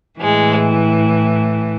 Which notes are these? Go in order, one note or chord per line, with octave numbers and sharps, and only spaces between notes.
A2 E3 G#3